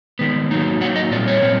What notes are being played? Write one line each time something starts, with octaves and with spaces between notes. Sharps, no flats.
D#3 G#3 B3
F#3 A#3 D#4
F#3 A#3 D#4 F#5
D#5
A#2 G3 C4 F4 D5
C#5
A#2 G3 C4 F4